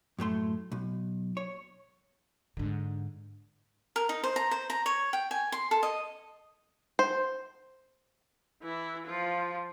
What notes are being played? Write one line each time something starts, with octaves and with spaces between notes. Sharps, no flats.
F#2 A2 A3 C6
B1
C#5
G#2 D3
A#4
D#4
C5
A#5
C5
A#5
C#5
G5
G#5
C6
A4
D#5
C5
E3 E4
F3 F4